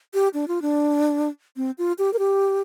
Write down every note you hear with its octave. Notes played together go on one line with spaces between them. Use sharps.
G4
D4
F4
D4
C4
F4
G4
A#4
G4